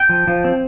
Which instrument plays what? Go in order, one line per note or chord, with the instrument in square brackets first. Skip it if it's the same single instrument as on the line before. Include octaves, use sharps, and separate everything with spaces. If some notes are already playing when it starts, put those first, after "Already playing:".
Already playing: [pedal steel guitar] G5
F3
F3
C4